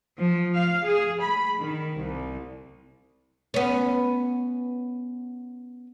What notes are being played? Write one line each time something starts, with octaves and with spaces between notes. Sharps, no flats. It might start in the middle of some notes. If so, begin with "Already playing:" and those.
F3
F5
G#4
B5
D#3
C2
B3 C#4